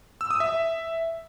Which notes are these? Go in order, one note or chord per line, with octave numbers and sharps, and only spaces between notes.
E6
D#6
E5